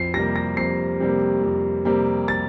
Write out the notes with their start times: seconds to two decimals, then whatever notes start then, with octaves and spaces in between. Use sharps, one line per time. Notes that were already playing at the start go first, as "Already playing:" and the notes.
Already playing: F2 C7
0.14 C3 A#6
0.17 G3 A#3
0.36 A#6
0.57 F2 C7
1.00 C3 G3 A#3
1.42 F2
1.85 C3 G3 A#3
2.28 A6